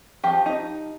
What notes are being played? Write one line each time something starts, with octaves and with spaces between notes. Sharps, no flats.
F3 G4
D#4